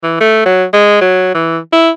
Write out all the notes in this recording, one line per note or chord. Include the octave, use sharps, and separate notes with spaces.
E3
A3
F#3
G#3
F#3
E3
E4